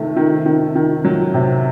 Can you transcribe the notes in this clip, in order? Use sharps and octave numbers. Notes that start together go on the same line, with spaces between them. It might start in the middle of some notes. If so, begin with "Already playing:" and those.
Already playing: C3 D#3 A3
D#3
D#3
D#3
F#3
C3